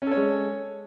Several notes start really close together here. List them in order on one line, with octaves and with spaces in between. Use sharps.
C#4 A4 C#5 G#3